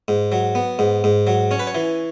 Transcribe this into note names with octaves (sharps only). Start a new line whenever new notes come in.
G#2
F#3
B3
G#2
G#2
F#3
C#4 C#5
B4
C#5
E3